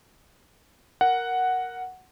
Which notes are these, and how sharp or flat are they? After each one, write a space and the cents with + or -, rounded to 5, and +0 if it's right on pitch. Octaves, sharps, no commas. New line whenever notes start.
A#4 +0 F#5 +0